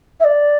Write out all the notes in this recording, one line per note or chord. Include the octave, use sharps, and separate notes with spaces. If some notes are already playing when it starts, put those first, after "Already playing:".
E5
D5